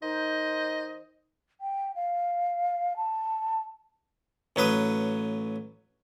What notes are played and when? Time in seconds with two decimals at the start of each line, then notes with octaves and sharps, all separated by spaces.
0.03 D#3 D#4 C5 D#5
1.61 G5
1.95 F5
2.96 A5
4.56 A1 F#3 B4 D#6